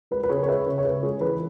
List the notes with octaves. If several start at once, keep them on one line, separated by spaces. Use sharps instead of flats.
G#3 B4
B4
C#3 G#4 C#5
C#5
G#3 B4 E5
C#3
C#5
C#3 B4
G#3 G#4
E3 B4